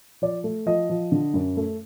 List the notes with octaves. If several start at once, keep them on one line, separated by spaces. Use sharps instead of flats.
F3 D5
A3
F3 D#5
F3
D3
F#2
A3